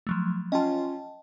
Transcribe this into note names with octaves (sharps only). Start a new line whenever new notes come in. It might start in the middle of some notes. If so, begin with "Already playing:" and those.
F3 F#3 A3
C#4 F4 D#5 G5 A5